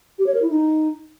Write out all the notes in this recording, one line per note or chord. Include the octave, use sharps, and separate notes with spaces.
G4
C#5
A#4
E4
D#4